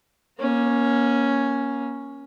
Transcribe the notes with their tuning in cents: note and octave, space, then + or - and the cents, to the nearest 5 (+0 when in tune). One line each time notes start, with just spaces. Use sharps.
A#3 +30 C#4 +0